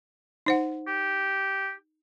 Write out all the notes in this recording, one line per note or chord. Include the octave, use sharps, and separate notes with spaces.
D#4 C5 F#5
G4